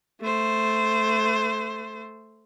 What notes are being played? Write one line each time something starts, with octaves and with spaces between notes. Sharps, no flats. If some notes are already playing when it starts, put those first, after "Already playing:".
A3 C5